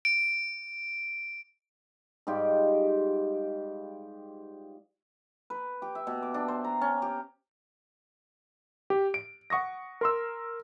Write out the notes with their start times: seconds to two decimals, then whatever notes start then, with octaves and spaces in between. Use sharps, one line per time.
0.05 D7
2.27 G#2 G3 F4 G4
5.50 B4
5.82 G4
5.95 E5
6.07 B2
6.22 D6
6.34 D4
6.48 C5
6.64 A#5
6.81 C#4
7.02 G4
8.90 G4
9.14 D7
9.50 F#5 C#6 D#6 A#6
10.01 A#4 C6 E6